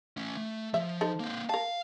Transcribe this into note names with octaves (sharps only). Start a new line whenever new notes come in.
A3 C#4
A3
F3 E5
D#4 A4 C5
A#3 C4
A#4 F5 A5